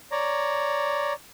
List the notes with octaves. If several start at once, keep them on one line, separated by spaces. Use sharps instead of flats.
C#5 D5 A#5